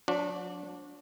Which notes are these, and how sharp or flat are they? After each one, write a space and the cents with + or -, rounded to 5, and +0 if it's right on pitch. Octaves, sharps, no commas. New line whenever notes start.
F#3 -45 D4 -15 F#4 -30